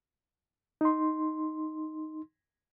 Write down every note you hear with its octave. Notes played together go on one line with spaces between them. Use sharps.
D#4 C6